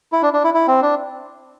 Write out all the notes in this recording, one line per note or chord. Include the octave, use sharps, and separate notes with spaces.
E4
D4
D4
E4
E4
C4
D4